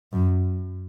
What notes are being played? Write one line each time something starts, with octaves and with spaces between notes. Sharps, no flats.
F#2